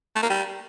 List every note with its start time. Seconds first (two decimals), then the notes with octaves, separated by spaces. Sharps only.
0.15 A3
0.22 A#3
0.29 G3